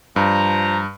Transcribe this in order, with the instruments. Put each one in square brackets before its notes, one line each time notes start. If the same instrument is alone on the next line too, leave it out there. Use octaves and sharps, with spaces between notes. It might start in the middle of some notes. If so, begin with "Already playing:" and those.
[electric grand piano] G2 [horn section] F3 A#5